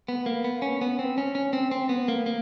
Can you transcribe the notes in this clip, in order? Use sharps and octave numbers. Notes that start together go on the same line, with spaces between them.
B3
A#3
B3
C#4
B3
C4
C#4
C#4
C4
C4
B3
A#3
A#3